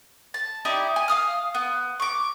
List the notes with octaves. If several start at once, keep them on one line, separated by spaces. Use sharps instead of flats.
A5
D#4 E4 G4 D5
G#5
F5 D#6 F6
B3
C#6 D6